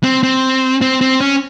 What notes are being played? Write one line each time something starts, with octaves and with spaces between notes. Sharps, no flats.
C4
C4
C4
C4
C#4